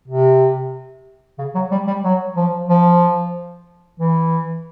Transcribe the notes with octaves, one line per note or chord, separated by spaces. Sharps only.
C3
C#3
F#3
G3
G3
F#3
F3
F3
E3